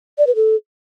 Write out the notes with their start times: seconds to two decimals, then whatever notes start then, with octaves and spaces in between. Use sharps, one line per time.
0.18 D5
0.27 B4
0.36 A4